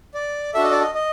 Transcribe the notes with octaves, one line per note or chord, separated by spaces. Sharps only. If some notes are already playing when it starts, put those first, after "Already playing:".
D5
D4 F#4 A4 E5
D#5
D5
D#5
D#5